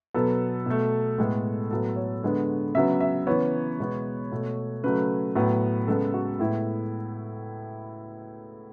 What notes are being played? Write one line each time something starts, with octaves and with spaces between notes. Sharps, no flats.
B2 F#3 B3 A4
B2 A3
A2 G#3 B3
A2 F#3 B3 A4
C#5
D3 G#3 B3
C#3 F#3 B3 E5
E5
C#3 E3 B3 C#5
B2 G#3 B3
B2 A3
C#3 F#3 A3 B4
A2 F#3 B3
C#3 G#3 B3 A4
F#4
A2 G#3 B3 E4